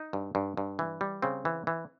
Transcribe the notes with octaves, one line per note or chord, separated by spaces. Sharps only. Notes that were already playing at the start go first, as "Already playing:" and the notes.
Already playing: D#4
G2
G2
G2
E3
G3
C#3 C4
E3
E3